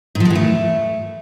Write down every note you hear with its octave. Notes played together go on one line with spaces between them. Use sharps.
G#2
F3
G#3
E3
A3